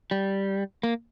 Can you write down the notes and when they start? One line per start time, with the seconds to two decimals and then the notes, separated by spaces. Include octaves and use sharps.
0.11 G3
0.83 A#3